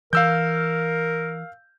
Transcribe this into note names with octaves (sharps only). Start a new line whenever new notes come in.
E3 A#4 F5 E6 G6